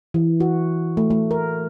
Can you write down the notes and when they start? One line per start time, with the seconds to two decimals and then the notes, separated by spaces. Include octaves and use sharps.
0.14 E3
0.40 F#4
0.97 A3
1.10 A3
1.31 A#4